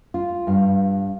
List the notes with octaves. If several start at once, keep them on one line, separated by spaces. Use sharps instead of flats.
F4
G2 F5